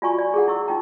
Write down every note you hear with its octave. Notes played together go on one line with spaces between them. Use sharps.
F4 F#4 D5 G#5 A#5 C#6
D5
G#4 A4 F#5
E4 C#6 E6
D#4 F4 G5 A#5